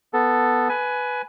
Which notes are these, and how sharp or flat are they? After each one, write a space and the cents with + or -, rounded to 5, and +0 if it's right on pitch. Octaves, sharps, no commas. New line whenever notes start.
B3 +0 A4 +0
B4 +0 G#5 +20